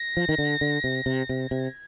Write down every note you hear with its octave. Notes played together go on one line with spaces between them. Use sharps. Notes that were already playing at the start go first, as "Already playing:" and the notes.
Already playing: A#6
F3
D#3
D3
D3
C3
C3
C3
C3 G#6